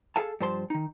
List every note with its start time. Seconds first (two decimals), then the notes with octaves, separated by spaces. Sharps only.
0.16 G#4 A4 F5 A5
0.40 G2 F3 C5 A5 C6
0.70 D#3 D#4